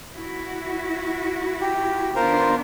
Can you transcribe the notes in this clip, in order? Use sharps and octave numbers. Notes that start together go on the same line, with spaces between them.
E4 F#4
G4
D#3 B3 D4 F4 A#4 C5